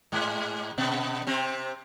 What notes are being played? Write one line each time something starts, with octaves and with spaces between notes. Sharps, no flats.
G#2 G#3
B2 B3
C3 C4